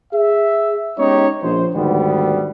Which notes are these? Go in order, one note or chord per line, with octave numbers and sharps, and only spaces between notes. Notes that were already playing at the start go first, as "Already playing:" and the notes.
G#4 E5
G#3 B3 C#4 D#4 G4 C#5
A#1 C5
D2 G#2 D#3 G3 B3